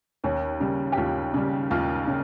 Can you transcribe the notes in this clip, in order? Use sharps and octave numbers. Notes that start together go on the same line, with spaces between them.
D#2 C#4
C#3 G3
G4
D#2 F4
C#3 G3
D#2 F4
C#3